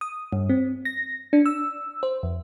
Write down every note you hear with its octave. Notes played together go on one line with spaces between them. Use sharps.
D#6
G2
C4
A#6
D4
E6
C5
F2